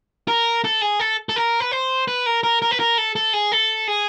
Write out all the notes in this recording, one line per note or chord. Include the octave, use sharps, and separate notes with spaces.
A#4
A4
G#4
A4
A4
A#4
B4
C5
B4
A#4
A#4
A#4
B4
A#4
A4
A4
G#4
A4
G#4